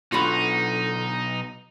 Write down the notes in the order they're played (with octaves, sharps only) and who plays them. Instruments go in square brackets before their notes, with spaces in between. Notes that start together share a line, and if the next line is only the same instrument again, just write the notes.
[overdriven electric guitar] B1 [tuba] D3 [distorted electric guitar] D#4 [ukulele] F4 F#4 B5